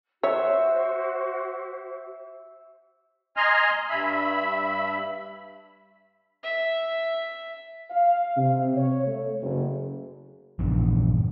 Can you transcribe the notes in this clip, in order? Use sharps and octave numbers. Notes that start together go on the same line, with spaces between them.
F#4 C5 C#5 E5
D#5 G#5 A#5 C6 F6
G2 E5 B5
E5
F5
C3
C#5
A3
F#1
A#1 E2 G2